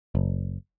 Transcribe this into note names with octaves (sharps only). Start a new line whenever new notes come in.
F#1